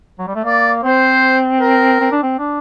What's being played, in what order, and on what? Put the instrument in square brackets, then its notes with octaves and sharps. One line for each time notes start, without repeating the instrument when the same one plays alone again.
[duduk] F#3
G3
A3
[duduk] A#3 [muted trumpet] D5
[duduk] C4 [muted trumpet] C5
[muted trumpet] A#4
[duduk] C4
D4
C4
D4